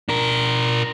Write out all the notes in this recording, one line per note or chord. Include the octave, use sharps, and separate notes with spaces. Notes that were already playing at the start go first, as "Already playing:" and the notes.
D4 A#4